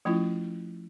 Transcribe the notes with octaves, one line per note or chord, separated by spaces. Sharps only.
F3 A3 C#4 E4 F4